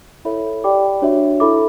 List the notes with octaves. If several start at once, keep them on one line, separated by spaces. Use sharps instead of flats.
E4 A4 C#5 E5 B5
G4 D5 G5 B5 D6
D4 F#4 C#5 E5
E4 A4 E5 B5 D6